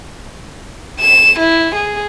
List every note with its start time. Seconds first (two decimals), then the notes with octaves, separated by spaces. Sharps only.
1.00 E7
1.39 E4
1.75 G#4